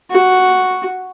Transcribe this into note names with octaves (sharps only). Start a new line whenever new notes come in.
F#4